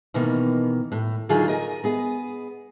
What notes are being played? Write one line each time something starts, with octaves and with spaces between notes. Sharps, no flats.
B2 D#3 E3 A#3
A2
D3 D#3 F#3 F4 G#4
A#4 D#5
B3 G#4 D#5